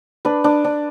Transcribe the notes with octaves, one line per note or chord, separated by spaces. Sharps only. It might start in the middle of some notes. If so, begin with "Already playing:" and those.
D4 B4
D4
D4